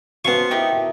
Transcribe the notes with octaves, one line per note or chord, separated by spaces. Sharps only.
B3 C#4 F4 F#4 C5 A5 C#6
D#4 E4 G4 A#4 E5